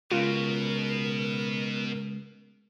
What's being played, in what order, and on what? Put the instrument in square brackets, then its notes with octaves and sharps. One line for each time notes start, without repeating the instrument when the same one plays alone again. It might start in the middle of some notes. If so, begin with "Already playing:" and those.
[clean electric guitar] C#2 [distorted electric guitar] B2 [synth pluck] F4 [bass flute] A#4